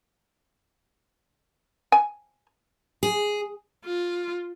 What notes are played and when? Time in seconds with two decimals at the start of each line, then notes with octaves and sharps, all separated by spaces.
1.92 G#5
3.03 G#4
3.85 F4